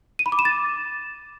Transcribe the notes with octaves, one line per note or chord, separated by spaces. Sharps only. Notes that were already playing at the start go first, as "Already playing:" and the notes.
D#7
B5
D6
E7
A6